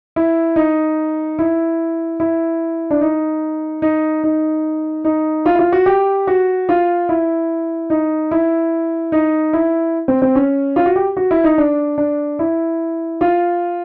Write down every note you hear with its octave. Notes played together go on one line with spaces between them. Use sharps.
E4
D#4
E4
E4
D4
D#4
D#4
D#4
D#4
F4
E4
F4
F#4
G4
F#4
F4
E4
D#4
E4
D#4
E4
C4
C4
C#4
F4
F#4
G4
F#4
E4
D#4
D4
D4
E4
F4